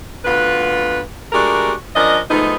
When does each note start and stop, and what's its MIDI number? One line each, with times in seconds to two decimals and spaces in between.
0.25 1.00 38
0.25 1.00 59
0.25 1.00 65
0.25 1.00 71
1.33 1.72 56
1.33 1.72 57
1.33 1.72 62
1.33 1.72 66
1.33 1.72 67
1.33 1.72 70
1.96 2.19 53
1.96 2.19 61
1.96 2.19 62
1.96 2.19 70
1.96 2.19 75
2.30 2.56 53
2.30 2.56 56
2.30 2.56 57
2.30 2.56 59
2.30 2.56 63